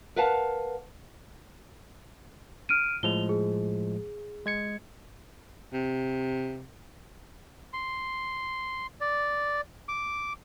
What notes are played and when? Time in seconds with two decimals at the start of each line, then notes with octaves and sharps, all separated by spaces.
0.16 A#4 B4 F5 F#5 A5
2.69 F6 D7 D#7
3.03 A2 F3 G#3 F7 G7
3.29 G#4
4.46 G#3 G#6 C#7
5.73 C3
7.73 C6
9.01 D5
9.88 D6